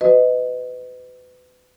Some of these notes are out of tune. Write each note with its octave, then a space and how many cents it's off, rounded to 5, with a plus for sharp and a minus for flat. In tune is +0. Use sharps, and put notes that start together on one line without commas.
F#4 +10 B4 +30 D#5 -5